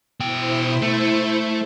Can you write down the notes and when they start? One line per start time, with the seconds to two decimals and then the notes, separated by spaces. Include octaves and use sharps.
0.20 B2 E4 C5 G5
0.82 A3